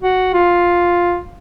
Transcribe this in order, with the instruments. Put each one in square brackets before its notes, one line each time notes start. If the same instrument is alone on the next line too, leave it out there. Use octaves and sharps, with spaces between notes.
[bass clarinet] F#4
F4